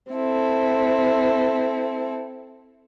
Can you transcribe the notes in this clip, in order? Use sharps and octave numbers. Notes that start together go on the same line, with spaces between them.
C4 E4 A4